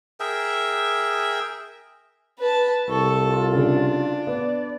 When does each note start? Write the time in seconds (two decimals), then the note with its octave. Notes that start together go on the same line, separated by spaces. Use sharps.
0.20 G#4 A#4 E5 G5
2.39 B4 A5
2.89 C2 A4 C#6
3.25 F4
3.55 C#3 D4
4.27 B3 D5